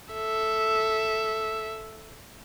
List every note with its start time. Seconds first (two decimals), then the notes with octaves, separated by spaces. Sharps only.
0.13 A4 E5